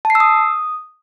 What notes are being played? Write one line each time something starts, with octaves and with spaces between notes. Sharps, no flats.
A5
C7
E6
D#6